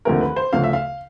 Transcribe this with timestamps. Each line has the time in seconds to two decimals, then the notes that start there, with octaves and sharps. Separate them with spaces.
0.05 D#2 D3 F3 A3 C4 A#4
0.21 B4
0.36 C5
0.53 D2 C#3 F3 A3 F5
0.64 E5
0.73 F5